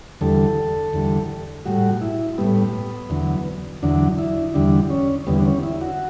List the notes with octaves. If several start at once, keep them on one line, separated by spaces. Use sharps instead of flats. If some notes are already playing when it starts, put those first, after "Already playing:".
E2 D3 G3 A4
E2 D3 G3
A2 G3 F#4
E4
A2 G3 B3
E2 D3 F#3
E2 D3 F#3 D4
E4
E2 D3 G3 D4
C#4
E2 D3 G3 B3
D4
C#4
E4
F#4